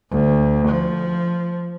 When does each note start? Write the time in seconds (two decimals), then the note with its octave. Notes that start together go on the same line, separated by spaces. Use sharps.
0.11 D2
0.68 F3